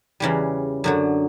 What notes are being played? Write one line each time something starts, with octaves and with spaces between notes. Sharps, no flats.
E2 C#3 E3 G3
F#2 D3 F#3